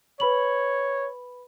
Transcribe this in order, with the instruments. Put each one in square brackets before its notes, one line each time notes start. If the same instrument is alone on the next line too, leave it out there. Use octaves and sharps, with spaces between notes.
[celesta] B4 B5 F#7 [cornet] C#5